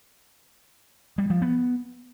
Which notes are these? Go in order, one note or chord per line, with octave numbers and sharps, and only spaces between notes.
G3
F3
B3